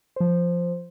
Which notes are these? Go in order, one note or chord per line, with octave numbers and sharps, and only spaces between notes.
F3 C5